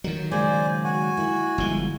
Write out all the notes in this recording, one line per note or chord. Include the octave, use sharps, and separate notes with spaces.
D#3 F#3 A#4
A#2 C#3 G#3 C5 D5 G#5
F#4 G#5
A#3 E4
G1 F3 G#3